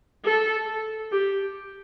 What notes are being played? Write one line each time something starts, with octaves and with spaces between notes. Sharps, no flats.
A4
G4